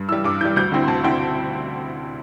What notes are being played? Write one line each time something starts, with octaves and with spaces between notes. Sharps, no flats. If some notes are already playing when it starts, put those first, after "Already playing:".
Already playing: G2
E3 G3 E6
G2 D6
E3 G3 G6
D2 G6
D3 C4 E4
C6
D2 A5
D3 C4 E4 G5